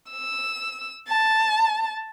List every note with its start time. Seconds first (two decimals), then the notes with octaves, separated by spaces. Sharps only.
0.12 E6
1.08 A5